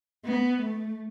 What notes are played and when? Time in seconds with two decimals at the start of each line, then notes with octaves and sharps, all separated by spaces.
0.25 B3
0.61 A3